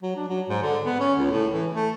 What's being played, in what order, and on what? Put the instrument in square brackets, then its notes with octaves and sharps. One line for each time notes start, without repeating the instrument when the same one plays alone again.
[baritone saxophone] F#3
D4
F#3
G#2
D3
B3
C#4
C#2
A2
E3
A3